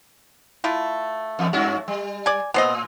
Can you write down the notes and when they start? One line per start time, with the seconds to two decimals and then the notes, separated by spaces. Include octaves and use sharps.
0.64 A3 E4 F4
1.39 E2
1.53 G2 C#4 F#4
1.88 G3
2.26 D5 G#5
2.54 A2 B3 C5 D#5